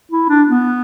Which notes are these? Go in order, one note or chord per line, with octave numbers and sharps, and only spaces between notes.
E4
D4
B3